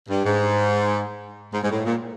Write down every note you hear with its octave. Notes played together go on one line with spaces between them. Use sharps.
G2
G#2
G#2
G#2
A2
A#2